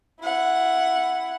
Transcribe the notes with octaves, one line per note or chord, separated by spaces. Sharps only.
E4 F#5